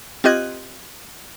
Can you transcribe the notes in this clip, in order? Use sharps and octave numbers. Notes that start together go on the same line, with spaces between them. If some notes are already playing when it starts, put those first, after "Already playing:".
C4 F4 G4 D#5 F#6 G#6